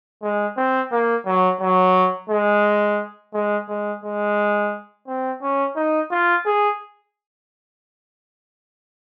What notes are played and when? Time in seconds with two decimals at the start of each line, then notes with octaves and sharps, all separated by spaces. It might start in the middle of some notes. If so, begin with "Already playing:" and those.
0.23 G#3
0.57 C4
0.92 A#3
1.26 F#3
1.61 F#3
2.30 G#3
3.34 G#3
3.69 G#3
4.04 G#3
5.08 C4
5.42 C#4
5.76 D#4
6.12 F4
6.46 G#4